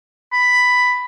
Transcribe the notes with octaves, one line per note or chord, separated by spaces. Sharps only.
B5